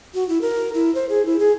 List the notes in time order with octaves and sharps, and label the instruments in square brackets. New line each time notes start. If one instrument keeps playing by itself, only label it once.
[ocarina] F#4
E4
A#4
E4
C5
G#4
E4
G#4